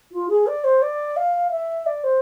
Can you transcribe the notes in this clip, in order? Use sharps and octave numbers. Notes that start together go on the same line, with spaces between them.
F4
G#4
D5
C5
D5
F5
E5
D5
C5